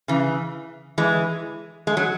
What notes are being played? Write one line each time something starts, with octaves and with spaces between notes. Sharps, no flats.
C#3 E3
E3 G#3
G#3
F#3